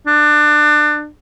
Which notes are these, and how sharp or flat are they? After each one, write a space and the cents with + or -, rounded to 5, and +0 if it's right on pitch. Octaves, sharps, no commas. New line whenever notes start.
D4 +25